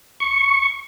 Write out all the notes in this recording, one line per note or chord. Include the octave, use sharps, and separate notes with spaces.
C#6